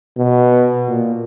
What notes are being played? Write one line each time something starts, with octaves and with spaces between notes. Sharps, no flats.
B2
A#2